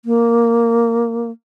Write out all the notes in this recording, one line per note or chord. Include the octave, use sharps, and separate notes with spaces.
A#3